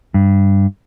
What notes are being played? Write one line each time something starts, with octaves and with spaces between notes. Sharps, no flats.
G2